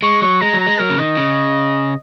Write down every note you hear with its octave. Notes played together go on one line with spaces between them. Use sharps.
G#3 C#6
F#3 C#6
G#3 A#5
F#3
A#5
G#3
F#3 A#4
C#3
D#3 D#5
C#3